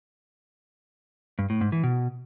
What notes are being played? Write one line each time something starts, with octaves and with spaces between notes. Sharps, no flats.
G2
A2
G#2
E3
B2